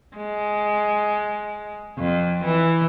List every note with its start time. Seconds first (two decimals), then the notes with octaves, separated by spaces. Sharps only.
0.17 G#3
1.98 F2
2.44 E3